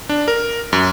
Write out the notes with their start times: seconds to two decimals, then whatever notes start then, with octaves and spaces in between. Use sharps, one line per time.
0.09 D4
0.28 A#4
0.73 F#2